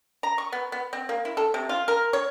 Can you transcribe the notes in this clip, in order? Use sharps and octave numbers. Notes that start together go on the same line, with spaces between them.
A#5
C#6
B3
B3
C4
A#3
E4
A4
C3
F4
A#4
C#5